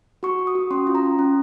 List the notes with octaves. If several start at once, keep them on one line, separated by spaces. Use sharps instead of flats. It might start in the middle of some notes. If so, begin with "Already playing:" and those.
F#4 C#6
F#4
D#6
F#4
C#4 C6
F4
A#5
C#4
C#4